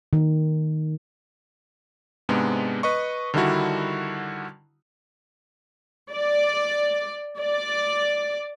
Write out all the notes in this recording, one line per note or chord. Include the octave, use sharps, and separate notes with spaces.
D#3
G#2 C3 G#3 B3 D4
B4 D#5 C#6
D3 D#3 G3 D4 E4 F#4
D5
D5